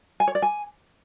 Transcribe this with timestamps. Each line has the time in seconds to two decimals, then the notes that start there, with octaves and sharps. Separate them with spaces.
0.20 G#5
0.28 C#5
0.35 D5
0.42 G#5